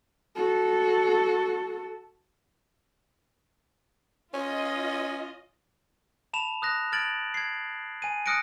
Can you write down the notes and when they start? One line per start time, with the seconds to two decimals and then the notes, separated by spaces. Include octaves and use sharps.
0.35 F#4 A4
4.34 C#4 F4 D#5
6.33 A5 B5 E7 F7
6.62 D#6 F#6 A#6
6.92 F6 G#6 A6 D7 F#7
7.34 G#6 C7
8.02 G#5 D#7
8.26 D#6 F6 F#6 A#6 C#7 D7